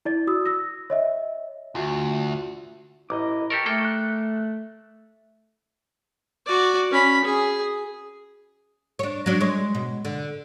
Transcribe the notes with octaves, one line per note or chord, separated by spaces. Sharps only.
E4 D5 A6
F#4 D#6 E6
E6 A#6
C#5 D#5 E5
D2 F4 F#4 E5
A1 E4 D#5 A#5 D6
G4 A4 A#4 C#6
A3 A#3 A4 G5
F#6
F#4 D5
C#4 B5
G#4
D4 C#5
F#3 D4
G#3 C#5
B2
D3